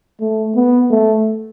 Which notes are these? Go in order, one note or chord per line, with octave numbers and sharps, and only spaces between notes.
A3
B3
A3